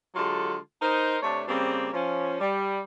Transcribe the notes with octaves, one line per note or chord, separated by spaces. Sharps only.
D3 F#3 G#3 F4 G4 A4
D#4 A#4 C5
C3 A3 D4 C#5
C#3 G3 A#3 C4
F3 C#4
G3